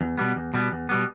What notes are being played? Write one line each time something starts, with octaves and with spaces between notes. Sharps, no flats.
E2
B2 G3 B3
E2
B2 G3 B3
E2
B2 G3 B3